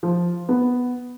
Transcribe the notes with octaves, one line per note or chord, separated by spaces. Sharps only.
F3
B3